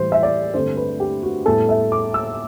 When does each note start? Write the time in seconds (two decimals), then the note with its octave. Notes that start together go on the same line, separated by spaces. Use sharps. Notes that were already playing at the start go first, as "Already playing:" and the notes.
Already playing: A2 E3 G3 C5
0.12 E5
0.23 D5
0.54 G2 D3 A3 C4 C5
0.77 B4
1.00 G4
1.23 F#4
1.46 A2 G3 B3 A4
1.69 E5
1.92 D6
2.14 E6